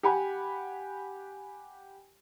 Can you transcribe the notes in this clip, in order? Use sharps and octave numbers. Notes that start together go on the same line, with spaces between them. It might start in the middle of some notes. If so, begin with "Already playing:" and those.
G4 F#5 G#5 B5